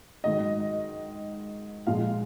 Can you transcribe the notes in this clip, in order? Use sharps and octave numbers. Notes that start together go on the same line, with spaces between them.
G#2 D#3 F#3 D#5
A#1 A#2 F3 G#3 F5